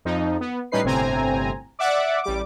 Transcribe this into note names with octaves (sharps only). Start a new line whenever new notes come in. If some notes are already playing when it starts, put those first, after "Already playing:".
F2 F3 D#4
B3
A2 G3 C#4 D#4 B4 C7
G1 A2 C3 C4 G#5 A#5
D5 E5 F#5 D6
A1 G3 D6